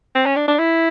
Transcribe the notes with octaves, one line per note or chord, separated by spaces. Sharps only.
C4
C#4
D4
D4
E4